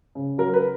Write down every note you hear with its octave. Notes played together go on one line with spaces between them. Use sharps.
C#3
F#3 A#4
B4